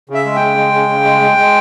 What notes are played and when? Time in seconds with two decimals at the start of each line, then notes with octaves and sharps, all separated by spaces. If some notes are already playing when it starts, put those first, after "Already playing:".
0.09 C#3 E5
0.25 G#3
0.36 G5
0.41 C#3
0.57 G#3
0.74 C#3
0.89 C#3
1.04 G#3
1.21 G#3
1.37 G#3